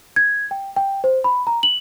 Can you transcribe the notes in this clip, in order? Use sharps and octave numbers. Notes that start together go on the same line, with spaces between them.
G#6
G5
G5
C5
B5
A#5
F#7